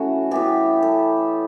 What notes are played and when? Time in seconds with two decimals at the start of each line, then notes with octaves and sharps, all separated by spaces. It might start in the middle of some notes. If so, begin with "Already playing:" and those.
Already playing: E3 A3 C#4 F#4
0.31 E3 B3 G4
0.83 A4